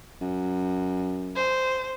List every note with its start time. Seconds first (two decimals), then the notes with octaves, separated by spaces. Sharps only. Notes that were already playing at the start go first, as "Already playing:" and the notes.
0.21 F#2
1.36 C5